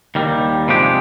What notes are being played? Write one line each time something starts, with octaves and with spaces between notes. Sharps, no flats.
D#2 D#3 G3
C3 F3 G#3 D4 G4